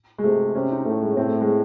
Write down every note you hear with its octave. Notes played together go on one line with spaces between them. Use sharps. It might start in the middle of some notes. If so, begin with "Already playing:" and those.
G#3
C3 A3
C3 C#4
D#4
A2 A3
G#3
A2 C4
A3
G#3